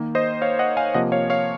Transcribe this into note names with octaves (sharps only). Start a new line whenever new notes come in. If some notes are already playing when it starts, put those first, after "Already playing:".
Already playing: D#3 A#3
C5 D#5
C#5 F5
D#5 F#5
F5 G#5
C3 F3 A#3 D#5 F#5
C#5 F5
C#5 F5